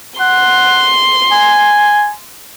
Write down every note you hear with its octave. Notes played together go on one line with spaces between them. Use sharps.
F#5 C6
G#5